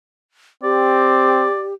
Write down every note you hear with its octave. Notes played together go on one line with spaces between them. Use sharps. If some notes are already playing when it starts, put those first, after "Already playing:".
C4 G4 D5